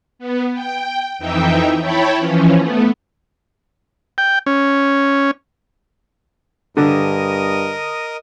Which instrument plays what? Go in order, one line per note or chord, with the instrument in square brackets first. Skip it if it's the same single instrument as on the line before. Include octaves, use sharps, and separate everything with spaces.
[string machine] B3
G5
F2 E3 D#4 E5 G5
E4 C#5 G5 A5 B5
E3 F3 C#4
A3 B3
[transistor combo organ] G5
C#4
[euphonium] G2 [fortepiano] D3 [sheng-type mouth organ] A#4 D#5 D#6